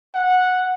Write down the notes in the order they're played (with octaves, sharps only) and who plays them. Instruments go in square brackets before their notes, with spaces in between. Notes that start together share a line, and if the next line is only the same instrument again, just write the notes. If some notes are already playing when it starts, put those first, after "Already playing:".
[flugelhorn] F#5